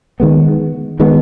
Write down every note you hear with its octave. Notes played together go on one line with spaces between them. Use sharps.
D#3 G#3 B3
D#3 G#3 B3